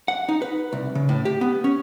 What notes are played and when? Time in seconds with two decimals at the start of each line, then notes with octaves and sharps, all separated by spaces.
0.08 F#5
0.29 D#4
0.42 B4
0.72 C2
0.95 C#3
1.09 A2
1.25 G4
1.41 B3
1.64 C#4